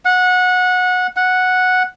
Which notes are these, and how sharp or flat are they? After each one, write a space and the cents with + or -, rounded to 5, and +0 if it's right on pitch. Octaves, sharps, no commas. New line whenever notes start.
F#5 -20
F#5 -5